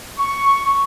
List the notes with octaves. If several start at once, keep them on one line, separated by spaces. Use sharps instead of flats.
C#6